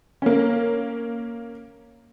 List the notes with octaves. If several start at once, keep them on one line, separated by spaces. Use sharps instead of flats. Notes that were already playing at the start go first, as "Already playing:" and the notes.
A#3 C#4